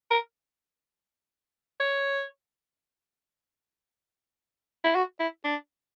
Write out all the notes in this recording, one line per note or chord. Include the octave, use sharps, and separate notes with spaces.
A#4
C#5
E4
F#4
E4
D4